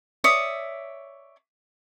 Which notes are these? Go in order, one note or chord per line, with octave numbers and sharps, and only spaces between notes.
C#5 D5 E5 D#6